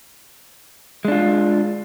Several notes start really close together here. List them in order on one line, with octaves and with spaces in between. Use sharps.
G#3 D4 F4